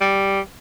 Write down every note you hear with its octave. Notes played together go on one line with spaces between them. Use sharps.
G3